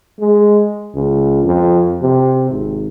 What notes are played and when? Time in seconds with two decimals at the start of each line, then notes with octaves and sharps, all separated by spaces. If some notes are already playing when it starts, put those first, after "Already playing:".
0.19 G#3
0.95 C#2
1.44 F2
2.02 C3
2.50 G#1